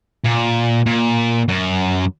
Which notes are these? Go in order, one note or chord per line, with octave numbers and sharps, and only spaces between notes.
A#2
A#2
F#2